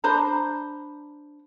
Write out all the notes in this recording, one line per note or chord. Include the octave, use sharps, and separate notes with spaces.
D4 C5 A#5 B5